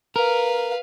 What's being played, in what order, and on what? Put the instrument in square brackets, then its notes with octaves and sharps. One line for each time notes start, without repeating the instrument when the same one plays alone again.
[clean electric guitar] A#4 [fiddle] B4 F5